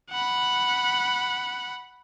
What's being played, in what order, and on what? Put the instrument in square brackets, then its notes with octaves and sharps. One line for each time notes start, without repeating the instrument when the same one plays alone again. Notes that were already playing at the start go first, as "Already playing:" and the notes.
[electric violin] F#5 B5